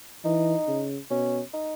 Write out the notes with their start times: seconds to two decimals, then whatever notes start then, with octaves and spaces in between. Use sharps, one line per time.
0.25 E3 D#4
0.68 C#3
1.10 B2 C#4
1.54 D#4